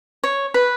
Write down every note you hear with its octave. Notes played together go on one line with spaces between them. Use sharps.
C#5
B4